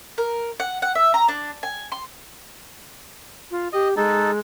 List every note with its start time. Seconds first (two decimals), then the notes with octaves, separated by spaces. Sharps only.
0.18 A#4
0.60 F#5
0.82 F#5
0.95 E5
1.14 A#5
1.28 D4
1.63 G#5
1.92 C6
3.51 F4
3.73 G4 D#5
3.97 G#3 D#4 A4